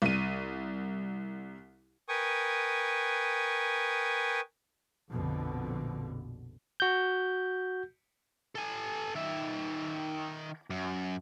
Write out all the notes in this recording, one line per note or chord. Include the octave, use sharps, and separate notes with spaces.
C2 D#7
A#4 B4 G5 G#5 C#6 D#6
A#1 F2 B2 D3
F#4 G6
A4 G#5
D#3 E5
F#2